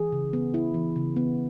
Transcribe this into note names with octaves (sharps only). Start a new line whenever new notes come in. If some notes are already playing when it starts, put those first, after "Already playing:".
Already playing: E3 G#4
C#3
B3
E4
E3
C#3
B3